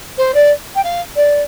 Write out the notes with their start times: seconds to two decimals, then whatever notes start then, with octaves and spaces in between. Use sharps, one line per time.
0.17 C5
0.34 D5
0.75 G5
0.83 F5
1.16 D5